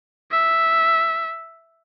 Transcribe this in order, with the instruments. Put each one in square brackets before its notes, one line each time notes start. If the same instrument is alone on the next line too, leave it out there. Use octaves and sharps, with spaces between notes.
[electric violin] E5